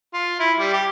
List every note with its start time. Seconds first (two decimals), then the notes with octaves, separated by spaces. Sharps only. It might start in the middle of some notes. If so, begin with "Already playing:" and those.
0.14 F4
0.40 E4
0.59 G3
0.73 G4